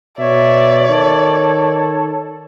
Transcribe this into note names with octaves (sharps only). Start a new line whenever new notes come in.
B2 C#5 D5 E5
D#3 A4